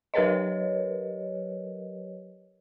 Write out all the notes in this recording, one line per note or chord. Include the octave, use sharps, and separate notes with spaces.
F#3 G4 A#4 B4 C#5 D#5